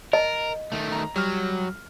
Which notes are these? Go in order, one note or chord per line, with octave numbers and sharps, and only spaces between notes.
A#4 D#5
D#3 A3
A#5
F#3 G3 F6